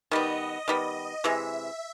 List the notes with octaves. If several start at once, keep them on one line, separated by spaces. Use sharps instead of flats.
D#3 G3 B3 D#5
D#3 G3 B3
C3 E3 G#3 E5